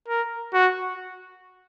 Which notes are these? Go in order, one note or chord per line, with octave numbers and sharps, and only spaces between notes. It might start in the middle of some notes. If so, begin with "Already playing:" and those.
A#4
F#4